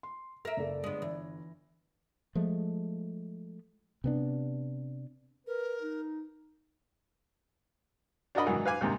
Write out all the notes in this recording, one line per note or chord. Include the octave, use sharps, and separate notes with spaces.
C6
A#4 E5 A#6 D7
F#1 A#3 A4 D5
G1 G#3 B3
E3
F3 G#3 A3
C3 B3 D4
A#4 B4
D#4
D4 F#4 A#4 D#5 B5
G#2 D#3 E3 F#3
B4 F5 G#5 D6
D#2 G#2 C3 D#3